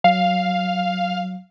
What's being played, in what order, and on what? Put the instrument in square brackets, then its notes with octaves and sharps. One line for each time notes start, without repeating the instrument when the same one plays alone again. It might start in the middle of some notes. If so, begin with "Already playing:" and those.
[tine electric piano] F#3 [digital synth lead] F5